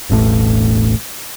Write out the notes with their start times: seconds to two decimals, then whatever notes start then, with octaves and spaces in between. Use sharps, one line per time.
0.10 E1 A1 A2 A3